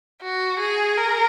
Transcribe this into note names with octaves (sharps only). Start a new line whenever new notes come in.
F#4
G#4
A#4